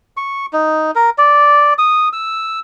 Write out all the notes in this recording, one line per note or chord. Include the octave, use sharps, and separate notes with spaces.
C#6
D#4
A#4
D5
D#6
E6